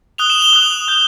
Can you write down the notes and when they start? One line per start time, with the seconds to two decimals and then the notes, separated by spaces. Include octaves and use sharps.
0.18 D#6 F#6 F7 G7
0.30 E7 F#7
0.42 F7 G7
0.53 D#6 F#6
0.88 D#6 G6